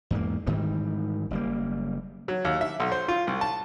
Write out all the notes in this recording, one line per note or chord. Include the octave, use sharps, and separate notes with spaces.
E2 G#2 A#3
G#2 D#3 E3 G3
F#1 G3 A#3
F#3
D#2
E5
B1
C5
F4
C2
A5